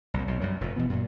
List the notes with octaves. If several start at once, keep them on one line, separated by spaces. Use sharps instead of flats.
C2 A#2
B1 B2
F#2 G3
F1 F2 A#2
B2 E3 B3
F#2 A#2